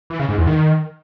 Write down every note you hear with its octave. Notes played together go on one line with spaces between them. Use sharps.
E3
C#3
G#2
E2
D#3